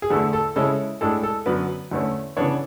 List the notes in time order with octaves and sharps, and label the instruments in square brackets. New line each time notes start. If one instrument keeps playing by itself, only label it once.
[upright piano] G#4
E2 D3 A3 A4
A4
C#3 G#3 C#4 E4 A4
A2 G#3 D4 A4
A4
F#2 D3 F#3 B3 B4
E2 D3 A3 C#4
C#3 E3 B3 D4 C#5